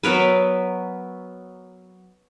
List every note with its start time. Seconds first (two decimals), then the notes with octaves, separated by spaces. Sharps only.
0.03 F#3 B3 A#4 B4